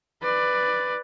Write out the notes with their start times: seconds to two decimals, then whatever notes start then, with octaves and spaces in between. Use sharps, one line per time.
0.23 B4 D5